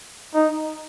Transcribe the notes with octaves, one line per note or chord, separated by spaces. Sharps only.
D#4